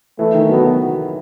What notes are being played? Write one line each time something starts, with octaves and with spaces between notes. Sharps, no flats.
E3 A3
D#3
F#3 B3
F#3